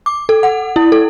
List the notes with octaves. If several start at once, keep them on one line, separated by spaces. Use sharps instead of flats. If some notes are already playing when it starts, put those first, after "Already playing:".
D6
A4
F#5
E4
A4